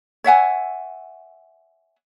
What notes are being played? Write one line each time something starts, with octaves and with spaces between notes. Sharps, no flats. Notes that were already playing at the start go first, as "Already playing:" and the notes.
C#5 E5 F#5 G#5